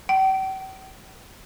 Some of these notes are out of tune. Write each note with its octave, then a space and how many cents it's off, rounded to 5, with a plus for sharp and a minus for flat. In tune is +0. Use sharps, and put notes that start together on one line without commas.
G5 -45